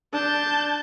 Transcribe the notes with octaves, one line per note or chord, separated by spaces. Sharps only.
D4 A5 G6